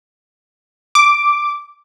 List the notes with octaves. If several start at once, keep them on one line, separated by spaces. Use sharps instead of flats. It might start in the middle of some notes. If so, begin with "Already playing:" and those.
D6